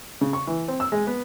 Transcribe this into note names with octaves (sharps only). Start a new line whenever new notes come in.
C#3
C#6
E3
C4
E6
G#3
B3